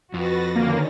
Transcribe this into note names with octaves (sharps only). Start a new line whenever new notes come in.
F2 F#4 B4 A6 A#6
D3 D#3 A#3 C#4